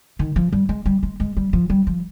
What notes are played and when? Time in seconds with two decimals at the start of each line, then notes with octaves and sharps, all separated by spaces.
0.19 D#3
0.36 F3
0.53 G3
0.69 G#3
0.86 G3
1.03 G#3
1.20 G#3
1.37 G3
1.53 F3
1.70 G3
1.87 F3